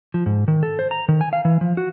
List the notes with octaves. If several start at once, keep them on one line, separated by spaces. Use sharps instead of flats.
F3
G#2
D#3
A4
C5
A#5
D#3
G#5
F5
E3
F3
F#4